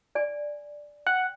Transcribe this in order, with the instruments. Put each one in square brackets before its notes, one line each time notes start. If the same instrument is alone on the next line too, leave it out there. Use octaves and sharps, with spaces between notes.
[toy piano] D5 G#5
[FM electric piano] F#5 [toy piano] G5